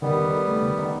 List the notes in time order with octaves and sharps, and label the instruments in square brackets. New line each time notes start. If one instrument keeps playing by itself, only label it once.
[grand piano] D#3 [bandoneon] G3 B3
[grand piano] D#4
A4
A3
D#3
D#4